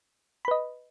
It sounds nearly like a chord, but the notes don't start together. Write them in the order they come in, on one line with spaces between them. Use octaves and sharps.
B5 B4 D#5